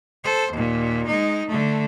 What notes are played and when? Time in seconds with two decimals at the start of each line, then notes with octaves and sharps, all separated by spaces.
0.24 A4 C5
0.52 D#2 A#2
1.07 G#3 D#4
1.47 D3 A3